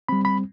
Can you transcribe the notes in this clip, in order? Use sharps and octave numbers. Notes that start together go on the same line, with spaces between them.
G3 C4 B5
B5